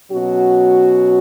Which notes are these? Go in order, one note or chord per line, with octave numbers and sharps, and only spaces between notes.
B2 F#3 C#4 F#4